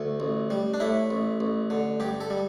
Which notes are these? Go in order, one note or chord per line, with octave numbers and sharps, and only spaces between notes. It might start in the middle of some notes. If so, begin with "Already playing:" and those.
Already playing: D2 A3
A1
G3
D4
A2 E4
A1
A1
D3
G2 G4
A4
G3